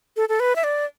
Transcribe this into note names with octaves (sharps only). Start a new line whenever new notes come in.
A4
A4
B4
E5
D5